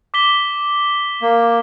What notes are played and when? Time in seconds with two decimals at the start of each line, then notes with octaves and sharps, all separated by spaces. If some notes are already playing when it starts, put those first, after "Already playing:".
0.14 D6 B6 G7
1.22 A#3